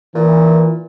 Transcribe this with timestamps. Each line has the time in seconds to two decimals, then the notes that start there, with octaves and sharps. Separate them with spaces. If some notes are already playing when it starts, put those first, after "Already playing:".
0.15 A#2 E3